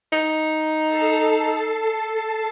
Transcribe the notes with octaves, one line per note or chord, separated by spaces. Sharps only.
D#4
A4 A5 C7